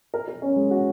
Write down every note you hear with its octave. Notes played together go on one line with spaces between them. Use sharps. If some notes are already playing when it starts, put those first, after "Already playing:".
A#4
A#4
C#4
G#3
F#4